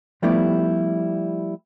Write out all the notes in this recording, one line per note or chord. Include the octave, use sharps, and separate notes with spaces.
F3 G3 A3 B3 E4 G4